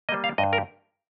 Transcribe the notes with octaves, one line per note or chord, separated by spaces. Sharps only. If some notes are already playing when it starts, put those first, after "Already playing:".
G3 A#3 D#5
F5
G2 D#5
A#4